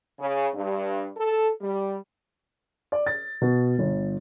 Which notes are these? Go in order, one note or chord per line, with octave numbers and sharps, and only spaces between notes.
C#3
G2
A4
G3
D5
A6
B2
G1